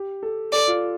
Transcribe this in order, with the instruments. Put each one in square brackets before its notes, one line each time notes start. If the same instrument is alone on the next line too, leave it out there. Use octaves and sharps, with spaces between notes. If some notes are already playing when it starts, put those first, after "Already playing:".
Already playing: [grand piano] G4
A4
[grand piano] A4 [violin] D5
[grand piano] F4